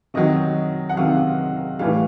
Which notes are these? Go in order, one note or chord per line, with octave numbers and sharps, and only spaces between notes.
C3 D#3 F#3 D#5
F#5
C3 D#3 F#3 F5
A2 E3 G3 F5